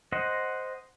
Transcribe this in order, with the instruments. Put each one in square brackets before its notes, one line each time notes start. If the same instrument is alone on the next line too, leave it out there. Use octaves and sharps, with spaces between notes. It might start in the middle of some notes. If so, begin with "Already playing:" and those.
[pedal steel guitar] C5 D#5 F#5